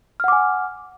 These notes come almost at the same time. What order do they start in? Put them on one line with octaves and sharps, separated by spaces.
F6 F#5 D6 G#5